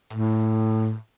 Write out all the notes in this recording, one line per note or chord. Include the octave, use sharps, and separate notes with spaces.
A2